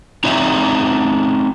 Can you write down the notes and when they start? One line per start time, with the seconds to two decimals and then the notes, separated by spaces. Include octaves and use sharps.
0.24 C4 D#4 E4 C#5 D5 E5